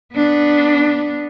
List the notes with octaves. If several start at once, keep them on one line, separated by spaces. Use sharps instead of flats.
B3 D4